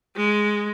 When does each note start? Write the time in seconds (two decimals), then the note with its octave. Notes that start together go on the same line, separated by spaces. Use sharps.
0.16 G#3